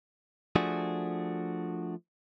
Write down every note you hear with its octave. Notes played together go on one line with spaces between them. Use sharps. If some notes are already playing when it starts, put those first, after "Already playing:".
F3 A3 D4 F#4 G#4